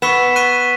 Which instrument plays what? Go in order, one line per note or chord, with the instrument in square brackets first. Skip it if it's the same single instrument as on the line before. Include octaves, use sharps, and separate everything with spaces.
[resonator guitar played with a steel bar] B3 [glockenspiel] C#6 E6 B6 E7
[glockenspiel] C#6 F#6 B6 D#7